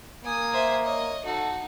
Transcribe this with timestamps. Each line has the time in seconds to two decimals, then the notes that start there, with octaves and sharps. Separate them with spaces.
0.24 A#3 G#5 D#6
0.53 C5 E5
0.84 C#5 D#5
1.25 D#4 F#4 A4